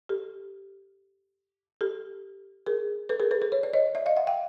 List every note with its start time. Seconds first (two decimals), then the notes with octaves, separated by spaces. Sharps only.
0.09 G4 A4
1.81 G4 A4
2.66 G#4 A#4
3.09 A4 B4
3.20 G#4 A#4
3.31 A4 B4
3.42 A4 B4
3.52 B4 C#5
3.63 D5
3.73 C#5 D#5
3.95 D5 E5
4.06 D#5 F5
4.16 E5 F#5
4.27 F5 G5